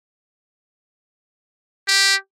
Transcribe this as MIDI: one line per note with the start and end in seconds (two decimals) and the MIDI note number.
1.88 2.16 67